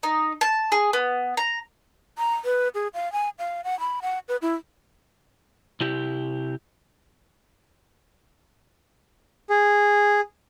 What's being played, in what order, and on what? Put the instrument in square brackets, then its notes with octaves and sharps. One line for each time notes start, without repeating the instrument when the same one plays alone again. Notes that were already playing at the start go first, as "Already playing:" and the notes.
[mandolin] D#4
A5
G#4
B3
A#5
[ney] A#5
B4
G#4
F5
G#5
F5
F#5
B5
F#5
B4
E4
[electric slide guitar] C3 E4 G4
[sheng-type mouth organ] G#4